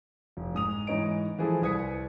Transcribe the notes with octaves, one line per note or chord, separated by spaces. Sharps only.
F1
G#2 D#6 F7
G#2 E3 D#4 C#5 D#5 D7
E3 F3 G#4 A4
C2 B4 D#6 G#6 B6 C#7